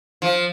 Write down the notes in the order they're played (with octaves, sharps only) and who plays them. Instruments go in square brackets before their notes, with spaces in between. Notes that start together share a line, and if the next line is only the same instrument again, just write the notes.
[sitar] F3